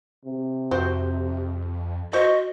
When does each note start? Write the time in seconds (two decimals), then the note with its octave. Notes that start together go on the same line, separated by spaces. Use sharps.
0.25 C3
0.71 F2 C4 F#4 C5
2.13 F#4 C5 D#5 C#6